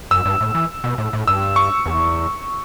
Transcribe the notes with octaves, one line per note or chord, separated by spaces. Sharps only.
F#2 E6
G2
A2
E3
B2
A2
A2
G2 E6
C#6
E2